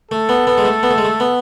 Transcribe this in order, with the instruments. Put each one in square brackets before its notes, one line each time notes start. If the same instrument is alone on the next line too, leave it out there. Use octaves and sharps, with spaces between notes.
[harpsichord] A3 [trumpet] A4
[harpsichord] B3
B3
G#3
A3
B3
A3
G#3
A3
B3